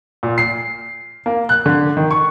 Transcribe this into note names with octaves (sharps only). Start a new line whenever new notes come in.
A#2
C7
A#3
F#6
D3
D#3
C#6